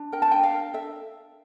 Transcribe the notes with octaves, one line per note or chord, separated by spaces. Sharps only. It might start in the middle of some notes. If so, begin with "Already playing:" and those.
Already playing: D4
A#4 G5
A5
D4 G5
F5
A#4
A4 E5